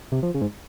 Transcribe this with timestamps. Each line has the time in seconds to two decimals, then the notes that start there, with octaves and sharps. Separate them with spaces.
0.12 C3
0.23 F3
0.34 C#3
0.41 G#2